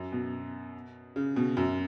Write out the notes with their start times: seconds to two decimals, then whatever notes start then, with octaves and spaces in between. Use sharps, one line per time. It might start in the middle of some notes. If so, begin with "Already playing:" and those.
Already playing: F#2
0.12 B2
1.16 C#3
1.36 B2
1.57 F#2